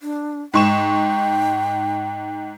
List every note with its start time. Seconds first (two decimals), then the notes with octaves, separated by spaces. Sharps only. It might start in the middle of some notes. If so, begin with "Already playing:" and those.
0.01 D4
0.54 G#2 G5 C#6 E7